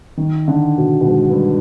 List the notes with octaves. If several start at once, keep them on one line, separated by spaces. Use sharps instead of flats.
D#3
D3
B2
B2
G#2
G2